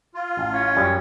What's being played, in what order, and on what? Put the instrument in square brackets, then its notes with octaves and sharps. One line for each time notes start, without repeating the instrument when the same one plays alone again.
[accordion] F4
[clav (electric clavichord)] A1
[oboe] C#4
[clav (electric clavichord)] F#2 G3 G#5